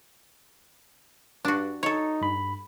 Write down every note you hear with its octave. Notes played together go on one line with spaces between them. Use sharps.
G2 D4 F#4
D#4 A4 C#5
G2 B5